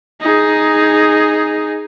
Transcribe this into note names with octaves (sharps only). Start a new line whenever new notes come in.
D#4 G#4